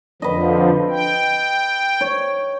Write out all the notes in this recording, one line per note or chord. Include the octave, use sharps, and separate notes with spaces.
F2 D3 F3 B4 D#5
G5
C#5